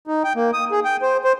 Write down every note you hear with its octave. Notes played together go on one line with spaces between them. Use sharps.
D#4
G5
A#3
D#6
G#4
G5
C5
C5